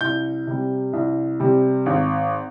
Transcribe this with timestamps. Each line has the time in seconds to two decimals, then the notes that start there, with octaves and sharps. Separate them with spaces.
0.01 C2 G6
0.47 C3 G3
0.93 C2
1.40 C3 G3
1.86 G#1